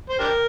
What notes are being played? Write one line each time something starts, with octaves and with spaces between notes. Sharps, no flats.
C5
D4 G4 A#4